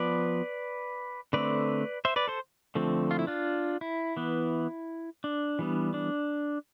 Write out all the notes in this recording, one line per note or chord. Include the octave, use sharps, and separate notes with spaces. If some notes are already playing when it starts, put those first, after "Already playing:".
Already playing: F3 B3 B4 D5
D3 A3 C4 B4 D5
C5 E5
B4 D5
A4 C5
D3 F3 A3 C4
F4
E4
D4 F4
E4
E3 B3
D4
E3 G3 B3
D4